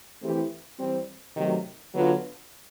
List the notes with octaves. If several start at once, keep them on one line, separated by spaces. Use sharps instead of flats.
E3 A3 C4 E4 G4
E3 G3 C4
C3 D#3 F#3 A3
D3 F#3 B3 D4 F4